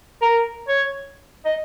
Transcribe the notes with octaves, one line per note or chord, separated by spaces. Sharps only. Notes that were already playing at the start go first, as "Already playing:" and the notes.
A#4
C#5
D#5